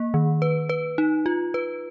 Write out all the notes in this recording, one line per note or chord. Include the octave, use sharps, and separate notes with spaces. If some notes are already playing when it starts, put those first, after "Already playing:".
Already playing: A#3
D#3
B4
B4
D#4
F4
B4